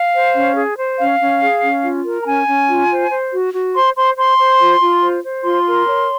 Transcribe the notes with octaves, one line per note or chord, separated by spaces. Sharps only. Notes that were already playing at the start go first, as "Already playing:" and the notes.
Already playing: F5
C5
C#4
G#4
C5
C#4 F5
C#4
G#4
C#4
F4
A#4
A#5
C#4 G#5
C#4
F4
C5
C5
F#4
F#4
C5 C6
C5 C6
C5 C6
C5
F4
F4
C5
C5
F4 C6
A#4
C#5